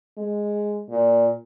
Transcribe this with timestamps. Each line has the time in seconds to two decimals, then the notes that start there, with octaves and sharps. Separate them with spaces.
0.17 G#3
0.90 A#2